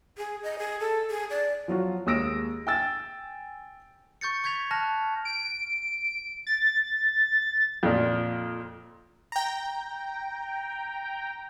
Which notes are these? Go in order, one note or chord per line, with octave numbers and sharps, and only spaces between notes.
G#4
D#5
G#4
A4
G#4
D5
F3 F#3 F4 F#4
D#2 G#3 D#6 E6 A#6 D7
G5 G#5 E6 A6
C#6 G6 A6 C#7
C#6 G6 G#6 B6 F7
A5 F6 F#6 A#6
D7
A6
F2 A#2
G5 A#5